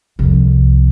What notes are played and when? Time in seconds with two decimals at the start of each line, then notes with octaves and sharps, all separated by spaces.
0.19 C2 F2